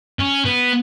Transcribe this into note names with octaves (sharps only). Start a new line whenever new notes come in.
C#4
B3